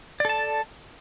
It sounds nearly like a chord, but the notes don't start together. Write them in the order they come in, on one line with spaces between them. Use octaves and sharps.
D5 A4 A5